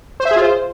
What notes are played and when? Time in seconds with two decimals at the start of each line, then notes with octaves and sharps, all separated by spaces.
0.20 C5
0.25 E5
0.31 G#4
0.36 F4
0.42 C5